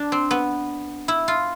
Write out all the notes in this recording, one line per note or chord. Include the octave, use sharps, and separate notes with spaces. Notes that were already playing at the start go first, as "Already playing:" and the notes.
Already playing: D4
C4
B3
E4
F4